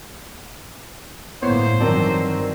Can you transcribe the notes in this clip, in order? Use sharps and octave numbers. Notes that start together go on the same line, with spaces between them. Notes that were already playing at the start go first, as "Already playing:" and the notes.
G1 A2 A#3 B3 E4 C5 C#5
G2 D#3 E3 F#3 C4 A#4 D5 A5